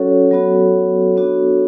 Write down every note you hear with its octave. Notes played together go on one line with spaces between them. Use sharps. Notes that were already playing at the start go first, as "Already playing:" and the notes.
Already playing: F#3 C#4 F#4 A4 C#5
F#3 B3 F#4
B3 D4 F#4